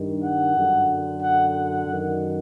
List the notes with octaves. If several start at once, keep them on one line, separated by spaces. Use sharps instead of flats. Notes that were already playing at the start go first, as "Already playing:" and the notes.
Already playing: G2 D#3
F#5
F#2 D3
F#5
F#5
F#2 D#3